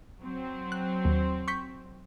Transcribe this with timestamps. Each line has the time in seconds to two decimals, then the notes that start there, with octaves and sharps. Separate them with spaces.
0.21 F#3 C4
0.72 F#6
1.05 D#2
1.48 C#6 G6 B6